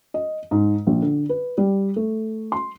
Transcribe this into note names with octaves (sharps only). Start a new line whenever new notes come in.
D#5
G#2
A#1
D3
B4
G3
A3
C6